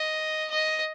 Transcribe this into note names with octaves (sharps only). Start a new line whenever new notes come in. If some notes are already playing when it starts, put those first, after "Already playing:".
Already playing: D#5
D#5